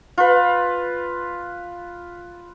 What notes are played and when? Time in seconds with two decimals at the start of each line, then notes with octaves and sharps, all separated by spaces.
0.18 F4 B4